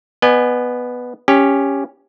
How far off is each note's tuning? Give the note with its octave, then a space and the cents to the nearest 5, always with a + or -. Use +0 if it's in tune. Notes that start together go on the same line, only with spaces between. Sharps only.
B3 +0 D#5 -40 G#5 +0
C#4 +0 G4 +15